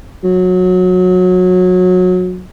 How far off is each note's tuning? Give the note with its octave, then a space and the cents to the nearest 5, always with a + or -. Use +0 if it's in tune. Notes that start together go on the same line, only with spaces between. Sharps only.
F#3 -20